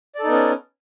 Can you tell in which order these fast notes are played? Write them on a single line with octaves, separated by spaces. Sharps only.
D5 A4 D#4 B3 C#4